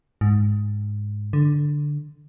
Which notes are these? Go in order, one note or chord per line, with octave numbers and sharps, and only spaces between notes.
G#2
D3